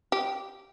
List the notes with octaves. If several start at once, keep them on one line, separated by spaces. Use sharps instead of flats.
G4